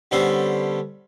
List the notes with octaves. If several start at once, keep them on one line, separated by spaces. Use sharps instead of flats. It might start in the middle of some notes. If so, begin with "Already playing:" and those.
D3 G3 B3 C#4 A4 C5